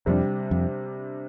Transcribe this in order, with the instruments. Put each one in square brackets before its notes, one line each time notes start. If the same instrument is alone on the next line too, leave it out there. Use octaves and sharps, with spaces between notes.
[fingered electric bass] F2 [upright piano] C3 G3 D4
[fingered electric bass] F2